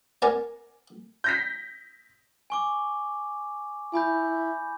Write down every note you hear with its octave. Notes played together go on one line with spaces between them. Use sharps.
A#4 D5 F#5 G#5
G6 A#6 B6
G#5 C#6 D6
E4 G#5 B5 G6